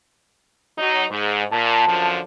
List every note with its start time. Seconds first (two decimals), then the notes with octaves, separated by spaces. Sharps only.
0.78 F#3 D#4
1.10 G#2
1.51 A#2 A5
1.86 F#2 D3 F3